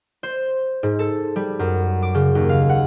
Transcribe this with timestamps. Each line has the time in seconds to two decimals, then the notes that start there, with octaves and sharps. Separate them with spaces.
0.23 C5
0.83 G#2
0.99 A4
1.36 G3
1.59 F#2
2.03 D6
2.15 C#3
2.35 D#2
2.49 F5
2.69 F#5